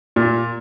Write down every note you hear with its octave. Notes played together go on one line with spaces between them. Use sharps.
A#2